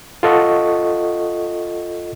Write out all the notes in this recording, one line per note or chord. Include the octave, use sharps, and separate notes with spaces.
F4 A4 D#5 F#5 C#6